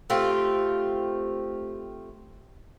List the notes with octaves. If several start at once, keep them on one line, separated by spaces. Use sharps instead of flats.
A3 C4 F4 G4